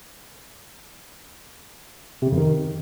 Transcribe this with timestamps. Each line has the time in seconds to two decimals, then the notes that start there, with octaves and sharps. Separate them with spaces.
2.22 C3
2.27 C#3
2.32 F2
2.37 D#3